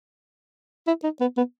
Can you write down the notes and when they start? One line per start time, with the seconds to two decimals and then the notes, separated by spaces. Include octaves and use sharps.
0.87 E4
1.03 D#4
1.21 B3
1.37 B3